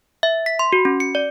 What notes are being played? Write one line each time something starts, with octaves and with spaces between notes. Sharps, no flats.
E5
B6
C6
F#4
C#4
C#7
D5